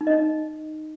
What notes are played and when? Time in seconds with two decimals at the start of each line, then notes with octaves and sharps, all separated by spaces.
0.01 D#4
0.07 D#5
0.13 D#4